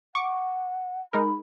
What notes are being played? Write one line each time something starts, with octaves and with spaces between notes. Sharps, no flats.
F#5 C#6 D6
G#3 D#4 A#4 B5